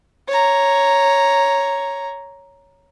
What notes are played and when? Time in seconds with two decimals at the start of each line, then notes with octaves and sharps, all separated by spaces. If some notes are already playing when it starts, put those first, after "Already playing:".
0.28 C#5 A#5